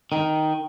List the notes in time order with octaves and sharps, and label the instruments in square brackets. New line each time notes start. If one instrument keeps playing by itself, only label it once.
[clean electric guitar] D#3